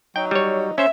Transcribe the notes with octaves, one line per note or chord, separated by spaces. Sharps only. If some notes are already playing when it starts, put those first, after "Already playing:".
F#3 D#4 G5
G3 C#5
C#4 C5 E5